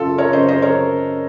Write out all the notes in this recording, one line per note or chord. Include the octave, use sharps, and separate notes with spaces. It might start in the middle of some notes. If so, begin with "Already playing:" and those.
Already playing: F#2 C#3 F4 A4
A#4 C#5
F#2 C#3 C5 D#5
C5 D#5
A#4 C#5